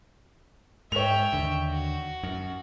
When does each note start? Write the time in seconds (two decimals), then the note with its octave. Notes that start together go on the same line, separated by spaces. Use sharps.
0.92 G#2 C#5 E5 G5 F7
1.33 D#2 D3
1.70 F#4
2.23 F#2